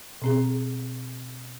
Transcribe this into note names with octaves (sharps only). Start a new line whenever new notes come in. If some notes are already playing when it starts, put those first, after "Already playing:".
B2 C4 G#4